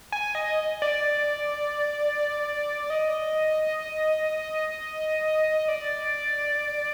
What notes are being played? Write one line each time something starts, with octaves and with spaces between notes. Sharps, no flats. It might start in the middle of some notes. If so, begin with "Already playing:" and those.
G#5
D#5
D5
D#5
D5